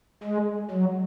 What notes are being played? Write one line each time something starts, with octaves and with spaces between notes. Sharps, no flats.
G#3
F#3